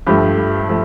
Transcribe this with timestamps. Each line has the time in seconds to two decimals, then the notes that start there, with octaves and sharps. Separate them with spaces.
0.07 G2 F3 A3 G4
0.69 F3 A3